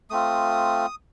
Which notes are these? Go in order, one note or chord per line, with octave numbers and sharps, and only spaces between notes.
A3 C4 F4 D#6